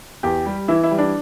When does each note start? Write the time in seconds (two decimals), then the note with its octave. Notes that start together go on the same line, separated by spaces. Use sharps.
0.23 E2 G4
0.46 G3
0.68 E3 E4
0.83 E4
0.91 G3
0.98 D4